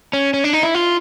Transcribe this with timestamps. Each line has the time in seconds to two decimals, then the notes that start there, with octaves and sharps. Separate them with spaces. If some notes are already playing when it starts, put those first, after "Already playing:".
0.13 C#4
0.34 C#4
0.44 D4
0.53 D#4
0.63 E4
0.75 F4